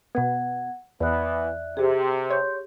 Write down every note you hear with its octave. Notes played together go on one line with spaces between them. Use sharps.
B2 B3 F#5 G#6
E2 E3 B3 D5 E5 F#6
C3 G4 G#4
C#5 C6 G6